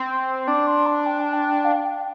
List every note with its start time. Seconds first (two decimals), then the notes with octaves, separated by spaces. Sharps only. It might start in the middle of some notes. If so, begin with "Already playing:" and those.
Already playing: C4
0.09 C6
0.47 D4 D6
0.67 C6
0.86 A5
1.06 G5
1.20 A5
1.33 G5
1.65 F5
1.85 G5